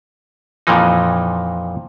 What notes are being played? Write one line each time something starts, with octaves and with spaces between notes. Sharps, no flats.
F2 A#2 E3 F3 D#4